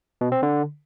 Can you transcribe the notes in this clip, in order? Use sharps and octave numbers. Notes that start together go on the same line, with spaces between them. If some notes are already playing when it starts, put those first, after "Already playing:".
B2
C4
D3